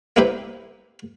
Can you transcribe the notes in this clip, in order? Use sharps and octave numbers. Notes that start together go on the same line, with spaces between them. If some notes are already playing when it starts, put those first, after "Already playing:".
A#3 C4 E4 G4 B4 C5